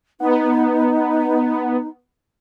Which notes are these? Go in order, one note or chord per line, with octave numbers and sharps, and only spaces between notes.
B3 D#4